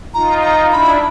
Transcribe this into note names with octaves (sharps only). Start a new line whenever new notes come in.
D#4 F4 A#5
A#5
D4 E4 B5